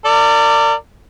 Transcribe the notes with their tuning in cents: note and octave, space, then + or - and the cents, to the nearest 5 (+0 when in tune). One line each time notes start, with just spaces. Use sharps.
A#4 -40 D5 +0